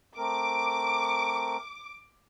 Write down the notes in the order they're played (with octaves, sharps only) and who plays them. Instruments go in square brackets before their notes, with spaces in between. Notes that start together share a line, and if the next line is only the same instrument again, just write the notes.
[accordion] A3 C4 A#4 [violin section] D6